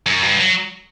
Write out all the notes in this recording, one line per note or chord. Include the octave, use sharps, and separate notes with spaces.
F#2
G2
F#3